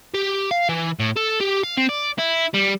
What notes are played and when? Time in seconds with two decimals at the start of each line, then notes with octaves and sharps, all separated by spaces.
0.15 G4
0.51 F5
0.69 E3
1.00 A2
1.17 A4
1.41 G4
1.64 F5
1.77 C4
1.89 D5
2.18 E4
2.54 G3